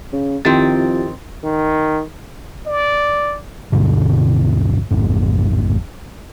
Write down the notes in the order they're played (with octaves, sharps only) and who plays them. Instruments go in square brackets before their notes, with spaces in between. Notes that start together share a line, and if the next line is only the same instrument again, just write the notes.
[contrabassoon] C#3
[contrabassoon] F2 [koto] D#3 C4 [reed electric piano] E4 G4 A6
[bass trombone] D#3
[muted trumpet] D5
[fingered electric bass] D1 G2 B2 D3
A1 F2 G#2